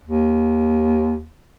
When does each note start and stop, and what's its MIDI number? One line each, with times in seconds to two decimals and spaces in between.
0.04 1.29 39